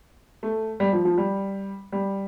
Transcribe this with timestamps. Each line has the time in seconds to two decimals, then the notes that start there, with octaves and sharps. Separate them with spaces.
0.43 A3
0.80 G3
0.93 F3
1.05 F3
1.18 G3
1.92 G3